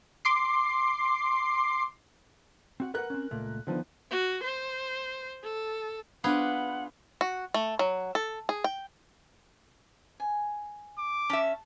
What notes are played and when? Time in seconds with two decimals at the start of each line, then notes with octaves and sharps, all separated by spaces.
0.25 C6 D6 C7
2.80 C4 F#4 F#5
2.94 A#4 B4 F#5 F#6
3.10 C4 C#4
3.31 C#2 A#2 A3
3.67 D3 D#3 F3 B3
4.11 F#4
4.43 C5
5.43 A4
6.24 B3 D4 F4 G#4 B4 F#5 D6
7.21 F#4
7.54 A3
7.79 F#3
8.15 A4
8.49 G#4
8.64 G5
10.20 G#5
10.98 D6
11.30 C#4 E5 A5